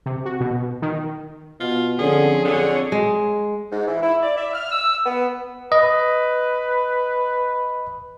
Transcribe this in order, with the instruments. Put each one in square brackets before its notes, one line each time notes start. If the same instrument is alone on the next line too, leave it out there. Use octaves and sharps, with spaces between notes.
[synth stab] C3
F#4
B2
D#3
[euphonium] B2 [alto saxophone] F4
[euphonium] D3 [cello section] F3 C4 C#4 [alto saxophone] G#4
[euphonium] F2 [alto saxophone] D3 [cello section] C4 G#4 C#5
[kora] G#3
[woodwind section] G#2
E3
E4
D5
E5
F6
E6
B3
[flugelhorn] B4 [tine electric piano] D#5